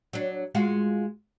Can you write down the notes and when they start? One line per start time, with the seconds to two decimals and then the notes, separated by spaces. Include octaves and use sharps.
0.13 F#3 D4
0.55 G#3 F4 F#4